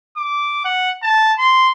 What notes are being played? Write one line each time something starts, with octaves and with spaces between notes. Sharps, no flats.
D6
F#5
A5
C6